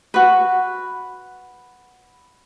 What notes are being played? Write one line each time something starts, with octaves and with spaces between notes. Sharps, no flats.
F#4 B4